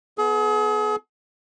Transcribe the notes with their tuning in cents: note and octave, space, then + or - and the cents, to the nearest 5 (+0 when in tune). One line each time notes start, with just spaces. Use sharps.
B3 +0 G#4 +40